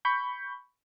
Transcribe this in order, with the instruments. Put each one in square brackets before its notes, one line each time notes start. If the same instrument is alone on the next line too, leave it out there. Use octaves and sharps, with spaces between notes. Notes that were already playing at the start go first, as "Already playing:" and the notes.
[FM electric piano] B5 C#6 G6